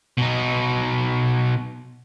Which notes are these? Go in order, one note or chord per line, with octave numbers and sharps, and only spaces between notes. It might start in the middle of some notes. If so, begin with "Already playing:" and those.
B2 D#4